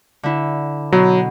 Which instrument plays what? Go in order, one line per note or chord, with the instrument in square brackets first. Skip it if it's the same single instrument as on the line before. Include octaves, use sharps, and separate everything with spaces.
[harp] D3 E4
[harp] B2 [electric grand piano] F#3